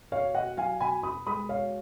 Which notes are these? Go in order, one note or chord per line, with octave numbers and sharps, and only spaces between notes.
B2 C#5 F5
B2 D#5 F#5
F#3 F5 G#5
B2 G#5 B5
B2 B5 D#6
G#3 B5 D#6
B2 C#5 F5